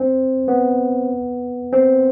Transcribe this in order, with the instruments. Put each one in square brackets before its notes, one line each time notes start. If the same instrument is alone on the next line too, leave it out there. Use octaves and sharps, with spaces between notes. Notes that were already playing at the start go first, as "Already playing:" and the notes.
Already playing: [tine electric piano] C4
B3
C4